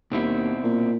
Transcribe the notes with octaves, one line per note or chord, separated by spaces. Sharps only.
D#2 B2 C4 E4
A#2